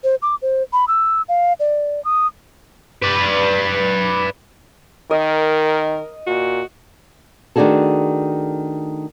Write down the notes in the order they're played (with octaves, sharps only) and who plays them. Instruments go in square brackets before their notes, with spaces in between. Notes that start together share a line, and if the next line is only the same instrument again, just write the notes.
[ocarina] C5
D6
C5
B5
E6
F5
D5
D#6
[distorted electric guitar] B4 D5
[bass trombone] D#3 [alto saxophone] A#4 [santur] D#5
[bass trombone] A#2 [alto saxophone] F#4
[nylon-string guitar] D#3 A3 D4 F#4 G#4 A4